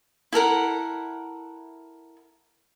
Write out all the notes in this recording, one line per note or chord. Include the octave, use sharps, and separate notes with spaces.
E4 A4 A#4 F#5